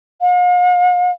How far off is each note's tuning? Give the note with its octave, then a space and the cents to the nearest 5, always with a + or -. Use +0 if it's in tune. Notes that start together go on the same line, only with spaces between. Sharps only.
F5 +45